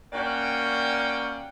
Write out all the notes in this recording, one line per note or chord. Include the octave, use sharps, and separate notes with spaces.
A#3 C#4 F#4 D5 F#5 G5